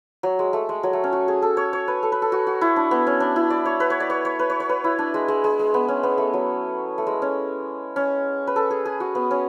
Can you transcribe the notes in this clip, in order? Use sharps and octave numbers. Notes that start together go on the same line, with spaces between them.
F#3
G#3
A3
G#3
F#3
A3
C#4
F#4
G#4
A4
C#5
C#5
B4
A4
B4
A4
F#4
F#4
E4
D4
B3
C#4
D4
E4
D5
C#5
B4
C#5
D5
C#5
C#5
B4
C#5
C#5
B4
E4
D4
G#3
G#3
G#3
G#3
B3
C#4
B3
A3
F#3
A3
G#3
C#4
C#4
B4
A4
G#4
G#4
F#4
B3
C#4